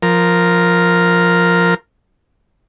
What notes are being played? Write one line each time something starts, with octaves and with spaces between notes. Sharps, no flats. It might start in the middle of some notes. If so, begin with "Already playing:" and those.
F3 A#4